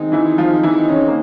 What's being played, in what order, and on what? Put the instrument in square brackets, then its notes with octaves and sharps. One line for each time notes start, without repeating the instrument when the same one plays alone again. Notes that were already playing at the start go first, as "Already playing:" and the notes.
Already playing: [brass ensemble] D#3 G#3 C4 D#4
[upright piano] E3 E4
F3 F4
E3 E4
C#3 C#4
A#3